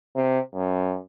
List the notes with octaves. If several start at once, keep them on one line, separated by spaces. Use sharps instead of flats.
C3
F#2